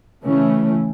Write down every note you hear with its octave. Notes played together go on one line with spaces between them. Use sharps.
C#3 E3 A3 C#4